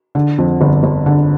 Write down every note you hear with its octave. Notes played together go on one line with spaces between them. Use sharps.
D3
F2
G1
G1
D3